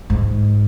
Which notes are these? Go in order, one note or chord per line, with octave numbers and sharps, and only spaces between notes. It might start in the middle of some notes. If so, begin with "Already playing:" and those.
G#2